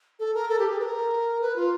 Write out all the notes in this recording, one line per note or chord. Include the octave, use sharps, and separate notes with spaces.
A4
A#4
A4
G4
G#4
B4
A#4
B4
F4